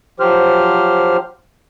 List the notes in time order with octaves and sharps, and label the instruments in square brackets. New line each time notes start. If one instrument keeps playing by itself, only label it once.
[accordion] F3 F#3 G4 C5 F6